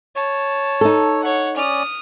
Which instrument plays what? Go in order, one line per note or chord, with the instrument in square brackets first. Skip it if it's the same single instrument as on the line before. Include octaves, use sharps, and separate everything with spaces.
[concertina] C#5 [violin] A5
[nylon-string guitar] D#4 A4
[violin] C#5 F#5
[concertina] C#4 D5 [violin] D#6 F6